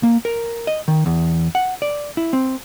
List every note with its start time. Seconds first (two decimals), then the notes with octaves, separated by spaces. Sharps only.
0.03 A#3
0.25 A#4
0.67 D#5
0.88 D#3
1.06 E2
1.55 F#5
1.82 D5
2.17 E4
2.33 C4